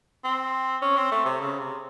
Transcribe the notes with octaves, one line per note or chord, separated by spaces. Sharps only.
C4
C#4
C4
A3
C3
C#3
C3